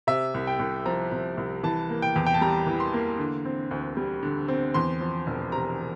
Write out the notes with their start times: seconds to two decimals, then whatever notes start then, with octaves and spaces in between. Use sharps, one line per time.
0.07 C3 E5
0.34 C2
0.47 G5
0.59 C2
0.86 F3 A#5
1.12 C3
1.37 C2
1.64 E3 A5
1.89 A#3
2.02 G5
2.16 E2
2.26 G5
2.34 A5
2.41 G3 A#5
2.67 E3
2.80 C6
2.93 A#3
3.19 D3
3.45 C4
3.71 D2
3.97 G3
4.23 D3
4.48 C4
4.74 E2 C6
5.01 F3
5.27 E1
5.52 C3 A#5